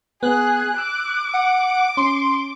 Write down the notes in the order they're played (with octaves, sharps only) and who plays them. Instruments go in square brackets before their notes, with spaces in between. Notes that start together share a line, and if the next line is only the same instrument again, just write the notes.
[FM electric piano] B3 [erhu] G#4 [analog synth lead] F#6
[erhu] D6 [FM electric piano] E6
[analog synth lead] F#5
[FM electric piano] C#4 [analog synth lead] C6